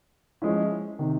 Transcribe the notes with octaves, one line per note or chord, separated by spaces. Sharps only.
F3 G#3 C#4 E4
C3 D#3